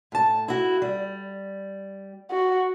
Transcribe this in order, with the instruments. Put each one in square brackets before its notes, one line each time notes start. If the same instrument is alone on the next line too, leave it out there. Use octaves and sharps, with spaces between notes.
[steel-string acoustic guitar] A2 A5
E4 F#4
G3
[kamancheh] F#4